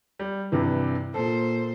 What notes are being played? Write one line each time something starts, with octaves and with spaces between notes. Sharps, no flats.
G3
G2 C3 E3
A#2 A4 C5